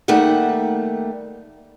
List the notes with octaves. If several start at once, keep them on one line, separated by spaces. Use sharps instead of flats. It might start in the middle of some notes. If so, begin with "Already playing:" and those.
D#3 G3 A3 A#3 F#5